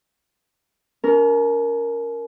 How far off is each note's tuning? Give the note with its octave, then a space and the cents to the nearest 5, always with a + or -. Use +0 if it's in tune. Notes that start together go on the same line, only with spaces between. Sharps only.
C#4 +45 A#4 +0